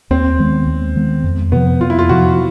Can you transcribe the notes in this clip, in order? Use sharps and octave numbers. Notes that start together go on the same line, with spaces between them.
D#2 C4
D#3 G#3 B3
D#2
D#3 G#3 B3
F2
C3 F3 B3
F2 F4
E4
F4
C3 F3 F#4